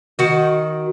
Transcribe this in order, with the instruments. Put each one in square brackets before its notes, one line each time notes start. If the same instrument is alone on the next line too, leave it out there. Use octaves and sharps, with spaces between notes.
[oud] D#3 F#4